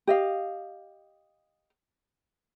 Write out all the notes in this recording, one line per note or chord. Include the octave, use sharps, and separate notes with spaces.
G4 D#5 F5